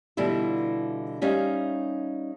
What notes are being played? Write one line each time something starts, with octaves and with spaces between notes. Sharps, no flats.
B2 D3 E3 G3 E4 F4
G3 C#4 D#4 E5 F5